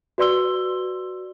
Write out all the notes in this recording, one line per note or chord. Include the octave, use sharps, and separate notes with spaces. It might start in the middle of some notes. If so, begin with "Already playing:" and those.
F#4 B4 D5 C6 E6 G7